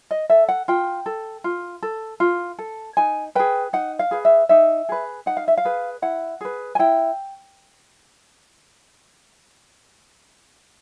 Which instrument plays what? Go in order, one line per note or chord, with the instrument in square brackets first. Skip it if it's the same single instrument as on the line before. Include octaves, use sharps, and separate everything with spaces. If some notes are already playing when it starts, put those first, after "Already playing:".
[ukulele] D#5
A4 E5
F#5
F4 G5
A4
F4
A4
F4
A4
D#4 G#5
G#4 B4 G5
D#4 F#5
F5
G#4 B4
E5
D#4 E5
G#4 B4
D#4 F#5
F5
E5
F5
G#4 B4
E4 F#5
G#4 B4
G#5
E4 G5